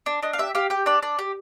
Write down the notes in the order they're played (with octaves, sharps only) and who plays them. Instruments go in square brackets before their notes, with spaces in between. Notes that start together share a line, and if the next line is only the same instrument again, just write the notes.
[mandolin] D4
D4 D#5
F5
G4 E5
G4 F5
G4 G5
D4 D5
D4 D5
G4